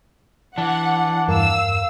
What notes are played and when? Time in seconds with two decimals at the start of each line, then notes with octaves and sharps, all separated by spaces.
0.58 E3 D4 F#5
1.28 E2 G2 A#4 F5 E6